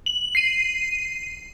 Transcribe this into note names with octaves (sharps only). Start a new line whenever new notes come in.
F#7
C7 D#7